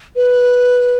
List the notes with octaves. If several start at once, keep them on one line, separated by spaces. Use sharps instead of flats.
B4